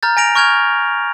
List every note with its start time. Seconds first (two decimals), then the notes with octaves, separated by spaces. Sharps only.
0.03 A#5 F6 G6 A6
0.17 G#5 A#6 D7 F7
0.35 C#6 F6 G6 G#6 F7